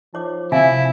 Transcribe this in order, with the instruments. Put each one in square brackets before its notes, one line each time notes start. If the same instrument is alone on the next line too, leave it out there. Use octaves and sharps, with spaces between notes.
[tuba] F3 [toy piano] D#4 C#5 D6
[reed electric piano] C3 [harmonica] E4 [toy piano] E5 F5 G#5